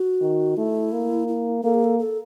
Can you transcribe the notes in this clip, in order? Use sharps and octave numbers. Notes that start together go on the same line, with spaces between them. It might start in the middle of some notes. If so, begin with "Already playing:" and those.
Already playing: F#4
D#3
A3 E4
A#3
E4
A#3 A4
G#4
A4
A4